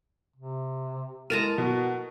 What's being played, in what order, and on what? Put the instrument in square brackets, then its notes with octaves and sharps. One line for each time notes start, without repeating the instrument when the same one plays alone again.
[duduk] C3
[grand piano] A2 A#3 [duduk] G#3 [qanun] A#4 A5 A#5 [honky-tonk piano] D#7
[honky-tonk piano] B2 [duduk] F#4